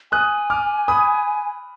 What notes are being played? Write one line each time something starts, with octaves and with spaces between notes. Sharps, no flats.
G#5 D#6 F#6
D6 F6
B5 D#6